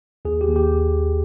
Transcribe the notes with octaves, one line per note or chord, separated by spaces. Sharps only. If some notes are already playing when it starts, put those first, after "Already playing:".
D#2 G#4
G4
D#2
G4